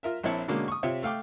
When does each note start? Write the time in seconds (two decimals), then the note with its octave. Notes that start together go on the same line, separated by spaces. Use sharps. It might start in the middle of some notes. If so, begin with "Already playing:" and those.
0.03 F4 A#4 E5
0.23 A#1 C4 E4 C#5 A5
0.48 B2 D3 G#3 A#3 C#4
0.68 C#6 D#6
0.83 C3 C4 F4 C#5 E5
1.03 A3 F5 G5 D6